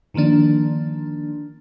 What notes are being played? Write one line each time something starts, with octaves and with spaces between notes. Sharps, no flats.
D3 D#3 F3 A#3 D4